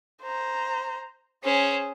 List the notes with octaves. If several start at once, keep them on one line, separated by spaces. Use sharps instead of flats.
C5 A#5
C#4 G#4 C5